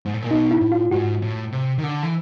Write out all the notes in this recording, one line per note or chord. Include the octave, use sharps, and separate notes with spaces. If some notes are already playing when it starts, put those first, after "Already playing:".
G#2
A2
A#2
B2 D#4
E4
A2
F4
G#2 F#4
A2
C3
D#3
D3
E3